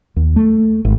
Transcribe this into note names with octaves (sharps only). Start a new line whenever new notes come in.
D#2
A3
G#1